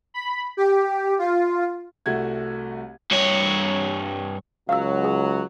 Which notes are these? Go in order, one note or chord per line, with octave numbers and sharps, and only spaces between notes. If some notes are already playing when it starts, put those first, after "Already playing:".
B5
G4
F4
C2 A3 F#4 F#5 G#6
G2 C#5
C#2 F#3 F5 E6
G#4